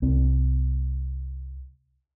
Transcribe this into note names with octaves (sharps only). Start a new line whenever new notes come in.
C2 C4